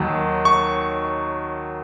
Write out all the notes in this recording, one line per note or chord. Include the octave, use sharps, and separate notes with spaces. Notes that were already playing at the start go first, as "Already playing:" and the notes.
Already playing: D#2 D#3 F#3
C#6